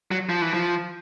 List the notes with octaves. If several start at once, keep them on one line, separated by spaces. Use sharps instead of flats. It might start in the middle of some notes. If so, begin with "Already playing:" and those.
F#3
F3
E3
F3